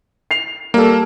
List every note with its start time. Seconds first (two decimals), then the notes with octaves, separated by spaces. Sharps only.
0.31 C7 F7
0.74 G3 A#3 A4